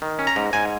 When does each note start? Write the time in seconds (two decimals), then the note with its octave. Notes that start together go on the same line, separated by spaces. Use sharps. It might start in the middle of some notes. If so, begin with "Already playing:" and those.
0.02 D#3
0.19 C#4
0.27 A#5
0.36 G#2
0.53 G#2 G#5